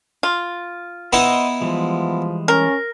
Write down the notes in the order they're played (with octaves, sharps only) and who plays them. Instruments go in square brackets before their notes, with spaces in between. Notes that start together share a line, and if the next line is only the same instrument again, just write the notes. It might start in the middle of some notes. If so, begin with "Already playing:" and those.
[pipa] F4
[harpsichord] B3 D#4 E4 [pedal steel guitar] C5 D#5 E5
[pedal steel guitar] E3 G3 G#3 [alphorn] F3
[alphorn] C#4 [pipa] A#4